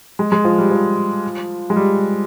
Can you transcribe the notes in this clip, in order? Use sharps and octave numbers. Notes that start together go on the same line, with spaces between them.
G#3
G#3
F3
G3
F3
G#3
G3